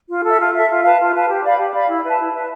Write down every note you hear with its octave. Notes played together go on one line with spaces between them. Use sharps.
F4
A4
E5
F4
A4 E5
F4
B4 F5 A5
F4
B4 F5 A5
G4
D5 F5 B5
G4
D5 F5 B5
E4
B4 E5 A5
E4
B4 E5 A5